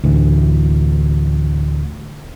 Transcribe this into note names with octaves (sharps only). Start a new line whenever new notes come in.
D2 A2 E3